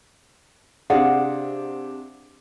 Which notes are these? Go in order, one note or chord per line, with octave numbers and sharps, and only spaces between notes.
C3 D4 G#4 F5 F#5